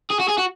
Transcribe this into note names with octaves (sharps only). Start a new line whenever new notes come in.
G#4
F#4
G#4
F#4